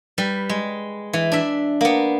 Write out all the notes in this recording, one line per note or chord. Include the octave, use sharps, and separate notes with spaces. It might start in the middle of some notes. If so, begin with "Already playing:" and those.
G3 B4
G#3
E3
D4 E5
A#3 B3